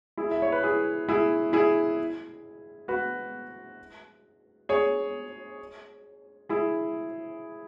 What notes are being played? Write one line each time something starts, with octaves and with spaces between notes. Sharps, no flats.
E4 G#4
E5
C#5
B4
E4 G#4
E4 G#4
E4 G#4
F#4 B4
G#4 C#5
E4 G#4